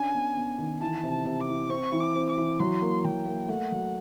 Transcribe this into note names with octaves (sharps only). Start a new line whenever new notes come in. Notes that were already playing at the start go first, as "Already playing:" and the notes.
Already playing: C#4 D4 G#5
B3
B3
D#3
E3 A5
C3
A5
C3
D6
E3
C4 C#6
E3
D6
C4
D6
E3
F#3 C6
A#3
F#3 G5
A#3
A3 F#5
F#3